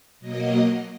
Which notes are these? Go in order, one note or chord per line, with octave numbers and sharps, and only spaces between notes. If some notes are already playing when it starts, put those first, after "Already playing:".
B2 F#3 A#3 D#5